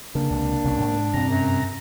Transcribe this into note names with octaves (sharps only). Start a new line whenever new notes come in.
C#3 A#3 D4
C#2 C3
C2 C3 C#4
G#2
G2 C3 C4 A#5
F#2